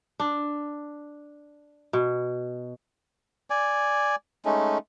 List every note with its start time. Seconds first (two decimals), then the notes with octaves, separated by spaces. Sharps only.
0.20 D4
1.93 B2
3.50 D5 G#5
4.45 G#3 A3 C#4 D#4